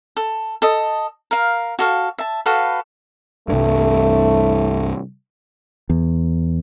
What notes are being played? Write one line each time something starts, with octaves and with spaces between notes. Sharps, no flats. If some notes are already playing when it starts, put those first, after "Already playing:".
A4
A4 D#5
A#4 F5
F#4 A4 F5
E5 A5
F#4 A4 B4 F5
C2 G2 A3
E2